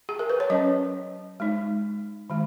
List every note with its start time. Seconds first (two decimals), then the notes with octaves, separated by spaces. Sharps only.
0.09 G#4
0.19 A#4
0.30 B4
0.40 C#5
0.50 F#3 C#4 D#5
1.40 G#3 D#4
2.30 D#3 G#3